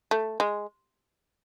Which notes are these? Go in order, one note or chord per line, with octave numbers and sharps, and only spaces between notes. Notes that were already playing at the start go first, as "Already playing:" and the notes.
A3
G#3